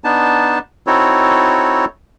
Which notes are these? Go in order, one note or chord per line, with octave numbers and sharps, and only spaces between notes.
B3 D4 D#4 A5
C4 D#4 E4 F#4 A4 C#5